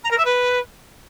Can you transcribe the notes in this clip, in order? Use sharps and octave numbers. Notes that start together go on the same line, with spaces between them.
A#5
A#4
E5
B4